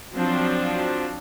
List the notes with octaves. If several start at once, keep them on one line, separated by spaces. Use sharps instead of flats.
F3 F#3 C4 D4